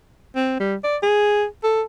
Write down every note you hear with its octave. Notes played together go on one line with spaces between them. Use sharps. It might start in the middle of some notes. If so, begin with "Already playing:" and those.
C4
G3
D5
G#4
A4